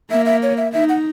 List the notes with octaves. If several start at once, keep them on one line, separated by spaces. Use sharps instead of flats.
A#3 E5
E5
C#5
E5
D#4 E5
F#5